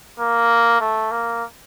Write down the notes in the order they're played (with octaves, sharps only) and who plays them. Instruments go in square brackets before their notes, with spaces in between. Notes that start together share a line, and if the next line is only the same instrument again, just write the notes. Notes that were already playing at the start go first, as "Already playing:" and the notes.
[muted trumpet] A#3
A3
A#3